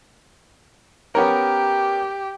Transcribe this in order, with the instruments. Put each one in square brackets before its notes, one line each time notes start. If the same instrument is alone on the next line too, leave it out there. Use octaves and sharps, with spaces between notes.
[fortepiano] B3 C#4 A#4 [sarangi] G4